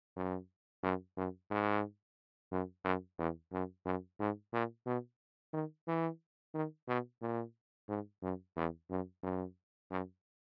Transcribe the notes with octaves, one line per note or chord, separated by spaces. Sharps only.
F#2
F#2
F#2
G#2
F#2
F#2
E2
F#2
F#2
G#2
A#2
B2
D#3
E3
D#3
B2
A#2
G#2
F#2
E2
F#2
F#2
F#2